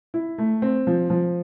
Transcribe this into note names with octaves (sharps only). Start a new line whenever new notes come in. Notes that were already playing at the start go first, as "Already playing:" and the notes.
E4
A3
C4
F3
F3